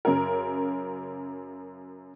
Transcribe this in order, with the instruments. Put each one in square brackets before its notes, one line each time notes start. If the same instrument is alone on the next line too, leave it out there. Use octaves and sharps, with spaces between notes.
[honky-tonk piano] F#2 C#3 A#4